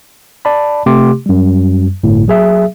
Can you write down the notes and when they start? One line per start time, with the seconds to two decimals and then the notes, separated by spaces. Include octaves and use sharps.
0.45 D5 A5 B5
0.86 C3 A3 G4 C6 D6
1.26 F#2 G3
2.03 G1 A2
2.28 F#3 G#4 E5